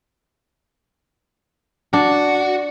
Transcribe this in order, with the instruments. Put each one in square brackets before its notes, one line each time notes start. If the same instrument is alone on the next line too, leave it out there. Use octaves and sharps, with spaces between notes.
[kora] D4 [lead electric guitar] F#4